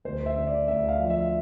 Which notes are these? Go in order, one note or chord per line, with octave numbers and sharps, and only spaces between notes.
D2 C5
E5
D3
D5
D2 E5
F5
F3
E5